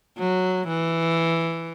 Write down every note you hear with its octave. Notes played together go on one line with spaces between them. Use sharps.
F#3
E3